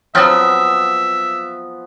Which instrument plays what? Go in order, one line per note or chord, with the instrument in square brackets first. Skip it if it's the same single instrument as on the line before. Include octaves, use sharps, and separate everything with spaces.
[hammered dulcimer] F3 B3 [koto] F#3 C4 [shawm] E5 [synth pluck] D#6 F6 A6